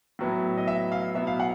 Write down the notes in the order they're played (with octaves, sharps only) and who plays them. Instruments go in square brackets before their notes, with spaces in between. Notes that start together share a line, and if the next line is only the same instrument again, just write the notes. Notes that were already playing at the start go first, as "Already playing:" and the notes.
[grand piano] A2 F#3 B3 E4
D#5
E5
F5
B2 F#3 B3 E4 E5
F5
F#5